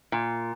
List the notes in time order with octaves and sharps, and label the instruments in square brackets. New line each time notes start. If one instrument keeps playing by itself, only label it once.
[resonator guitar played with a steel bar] A#2